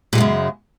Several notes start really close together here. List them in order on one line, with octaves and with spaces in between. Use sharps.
A#2 G#3 F#2 C#3